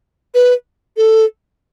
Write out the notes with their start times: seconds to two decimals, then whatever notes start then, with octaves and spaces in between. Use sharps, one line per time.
0.34 B4
0.97 A4